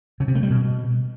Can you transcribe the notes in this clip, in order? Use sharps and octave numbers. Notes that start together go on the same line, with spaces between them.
C#3
C3
A3
G3
B2